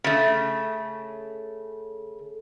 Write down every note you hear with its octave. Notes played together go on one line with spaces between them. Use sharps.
C#3 A3